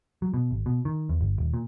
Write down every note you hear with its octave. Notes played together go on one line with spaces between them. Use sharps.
F#3
B2
G#1
B2
D#3
E2
G1
D#1
A#2